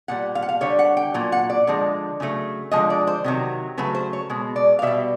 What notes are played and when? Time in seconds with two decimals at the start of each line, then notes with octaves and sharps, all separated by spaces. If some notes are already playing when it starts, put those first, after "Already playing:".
0.08 A#2 G3 F#5
0.35 F5
0.42 F#5
0.49 F5
0.61 D3 G3 C#5
0.79 F#5
0.97 G5
1.14 A#2 F#3
1.32 F#5
1.50 D5
1.67 D3 F3 G#3
2.20 C#3 F#3 A3
2.71 D3 F3 G#3 D#5
2.90 D5
3.07 C5
3.24 C3 D#3 F#3
3.78 C#3 F#3 A3 B4
3.95 C5
4.13 C#5
4.30 B2 G#3
4.56 D5
4.79 F5
4.82 B2 G3 E5